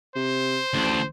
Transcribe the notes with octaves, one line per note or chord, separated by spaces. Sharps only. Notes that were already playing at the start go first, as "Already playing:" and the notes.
C3 C5
A1 D2 D4